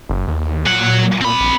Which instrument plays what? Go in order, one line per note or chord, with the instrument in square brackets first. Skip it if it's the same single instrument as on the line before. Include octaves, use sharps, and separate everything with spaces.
[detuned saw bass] F#1
D#2
[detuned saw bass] A#2 [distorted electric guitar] F#3 F#5
[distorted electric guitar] C4 B5
[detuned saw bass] A#1